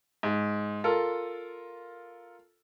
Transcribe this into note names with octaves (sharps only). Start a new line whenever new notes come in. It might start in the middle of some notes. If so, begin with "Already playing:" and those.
G#2
F4 A4 A#4